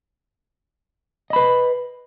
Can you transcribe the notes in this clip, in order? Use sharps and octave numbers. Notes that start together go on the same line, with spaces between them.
B4 D#5 B5